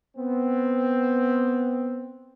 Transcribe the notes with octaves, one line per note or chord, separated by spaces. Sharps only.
B3 C4